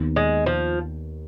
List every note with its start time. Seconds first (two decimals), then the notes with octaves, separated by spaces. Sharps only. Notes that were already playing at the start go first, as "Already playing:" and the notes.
Already playing: D#2 D#3 B3
0.16 G#3
0.46 F3